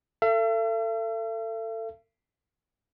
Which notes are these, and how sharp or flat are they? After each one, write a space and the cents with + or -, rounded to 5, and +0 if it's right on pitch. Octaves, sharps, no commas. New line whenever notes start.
A4 +25 E5 +45